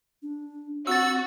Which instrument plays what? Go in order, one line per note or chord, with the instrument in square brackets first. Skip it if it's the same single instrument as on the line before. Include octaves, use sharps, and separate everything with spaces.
[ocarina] D4
[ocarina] C4 [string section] F#4 [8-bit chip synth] E6 A6